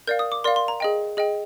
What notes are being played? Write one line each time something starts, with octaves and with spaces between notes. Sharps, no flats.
A#4 D5 F5 G6
D#6
D6
A#4 D5 F5 C6
C6
A#5
G#4 D#5 G5
G#4 D#5 G5